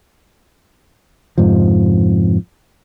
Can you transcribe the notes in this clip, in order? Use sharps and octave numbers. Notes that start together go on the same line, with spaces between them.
F2 G#2 C3 F3